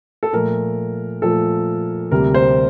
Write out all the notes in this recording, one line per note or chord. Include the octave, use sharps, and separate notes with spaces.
A4
A#2 F3 A3 A#4
A#2 F3 A3 A4
D2 C3 G3 A#3 A#4
C5